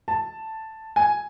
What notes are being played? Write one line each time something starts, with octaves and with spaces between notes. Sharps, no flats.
A5
G#5